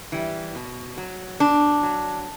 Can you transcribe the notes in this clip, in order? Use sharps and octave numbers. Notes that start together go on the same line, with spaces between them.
E3 G3
B2
F#3
B2 D4
F#3